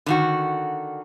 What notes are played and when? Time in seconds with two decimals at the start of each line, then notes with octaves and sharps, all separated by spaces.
0.06 D3 D#3 F#4